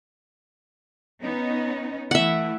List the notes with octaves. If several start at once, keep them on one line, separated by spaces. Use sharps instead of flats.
B3 C#4 D#4
E3 A3 E4 E5 F#5